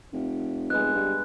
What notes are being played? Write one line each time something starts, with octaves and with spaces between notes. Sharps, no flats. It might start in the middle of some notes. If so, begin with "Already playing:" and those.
F1
G#3 B3 D#5 F#6
G2